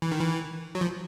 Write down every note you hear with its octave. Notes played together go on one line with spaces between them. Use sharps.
E3
D#3
E3
F#3
F3